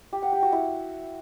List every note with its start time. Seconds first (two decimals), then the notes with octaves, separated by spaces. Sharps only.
0.13 G4
0.23 F#5
0.32 G4
0.42 F#4
0.52 E4